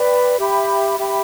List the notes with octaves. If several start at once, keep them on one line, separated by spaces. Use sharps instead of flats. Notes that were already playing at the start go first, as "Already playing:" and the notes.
Already playing: B4 D5 G5 B5
G4 E5 G5 B5
G4 E5 G5 B5